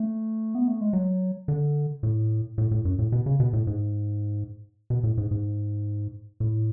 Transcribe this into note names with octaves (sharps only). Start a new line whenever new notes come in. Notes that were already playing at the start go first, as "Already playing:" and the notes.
Already playing: A3
B3
A3
G#3
F#3
D3
A2
A2
A2
F#2
A2
B2
C#3
B2
A2
G#2
B2
A2
G#2
G#2
A2